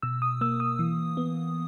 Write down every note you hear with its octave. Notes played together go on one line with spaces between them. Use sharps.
B2 E6
D#6
A#3 E6
D#6
E3
B3